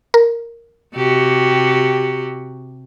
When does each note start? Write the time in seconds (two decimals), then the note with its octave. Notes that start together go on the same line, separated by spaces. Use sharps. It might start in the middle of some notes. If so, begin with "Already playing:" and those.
0.14 A#4
0.95 C3 F#4 G4